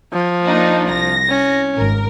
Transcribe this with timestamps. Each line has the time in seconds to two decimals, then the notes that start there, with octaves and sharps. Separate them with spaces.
0.13 F3
0.45 A#3 D4 D#4
0.87 C2 A#6
1.29 C#4
1.75 G#1 A#4